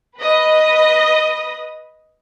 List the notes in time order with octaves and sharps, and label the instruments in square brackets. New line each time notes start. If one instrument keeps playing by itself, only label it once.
[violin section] B4 D#5